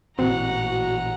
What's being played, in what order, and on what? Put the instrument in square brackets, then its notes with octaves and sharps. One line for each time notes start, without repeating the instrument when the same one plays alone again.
[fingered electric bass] A1 A#2 E3 [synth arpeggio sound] C4 [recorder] F#4 [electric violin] F#5 A#5